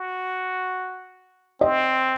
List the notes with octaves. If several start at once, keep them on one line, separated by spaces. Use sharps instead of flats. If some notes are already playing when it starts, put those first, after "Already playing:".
Already playing: F#4
C4 D#5